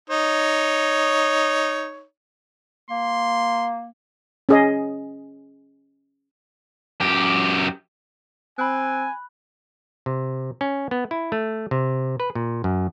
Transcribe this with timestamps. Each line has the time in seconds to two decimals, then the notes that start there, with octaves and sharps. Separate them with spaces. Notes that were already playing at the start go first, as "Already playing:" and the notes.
0.10 D#4 C#5
2.91 A#3 C6
4.49 C#4 G#4 D#5
7.01 F#2 G4
8.58 C4 G#5 B5 F#6
10.06 C3
10.61 C#4
10.91 B3
11.11 E4
11.32 A3
11.71 C3
12.20 B4
12.35 A#2
12.64 F#2